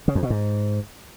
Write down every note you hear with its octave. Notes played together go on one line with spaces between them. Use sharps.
C#3
F2
B2
G#2